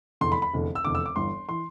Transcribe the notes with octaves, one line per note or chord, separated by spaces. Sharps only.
F1 E2 D3 C6
B5
B5
F1 E2 D3
E6
F1 E2 D3 D6
E6
D6
G1 G2 E3 C6
E3 C6